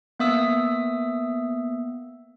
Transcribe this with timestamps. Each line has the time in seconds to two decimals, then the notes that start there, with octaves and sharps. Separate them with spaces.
0.19 A#3 B3 E5 D#6 E6